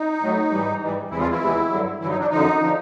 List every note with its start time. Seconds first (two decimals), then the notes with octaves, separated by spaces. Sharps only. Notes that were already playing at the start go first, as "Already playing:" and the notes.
Already playing: D#4
0.20 A2 F#3 A3
0.51 G#2 E3 G3
0.80 G#2 E3 G3
1.10 E2 C3 E3 G#3 E4
1.20 F3 F4
1.30 E3 E4
1.41 E2 C3 E3 G#3
1.70 G2 D3 F#3
2.00 G2 D3 E3 F#3 E4
2.10 D#4
2.20 D4
2.30 F#2 D3 F3 D#4
2.60 D3 F3